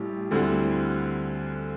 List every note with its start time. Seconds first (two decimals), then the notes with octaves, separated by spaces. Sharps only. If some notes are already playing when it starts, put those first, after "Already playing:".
Already playing: A1 A2 G3 G4
0.31 D2 D3 G3 C4 E4